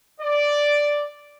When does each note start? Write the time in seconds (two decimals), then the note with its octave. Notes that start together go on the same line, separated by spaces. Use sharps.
0.21 D5